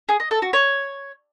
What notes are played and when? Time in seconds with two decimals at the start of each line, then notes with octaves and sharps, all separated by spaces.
0.09 G#4
0.20 D#5
0.31 A4
0.42 F#4
0.53 C#5